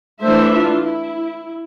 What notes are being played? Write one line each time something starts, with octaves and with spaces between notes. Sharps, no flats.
E3 A3 D4 C5 E5
F4
E4